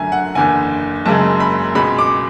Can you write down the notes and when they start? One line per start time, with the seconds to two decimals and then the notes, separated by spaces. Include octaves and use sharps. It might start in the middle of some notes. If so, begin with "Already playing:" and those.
Already playing: F#2 D3 A3 G#5
0.12 F#5
0.35 F#1 E2 D3 G#5
1.05 F#1 F#2 C#3 G#3 A5
1.40 B5
1.75 C#2 B2 G#3 B5
1.98 D6